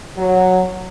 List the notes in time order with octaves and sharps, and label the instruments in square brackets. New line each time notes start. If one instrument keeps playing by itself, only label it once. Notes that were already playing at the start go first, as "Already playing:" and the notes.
[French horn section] F#3